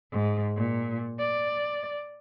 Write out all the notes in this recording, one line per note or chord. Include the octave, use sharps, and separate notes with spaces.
G#2
A#2
D5